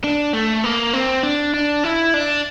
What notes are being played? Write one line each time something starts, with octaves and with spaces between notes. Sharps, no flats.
D4
A3
A#3
C4
D4
D4
E4
D4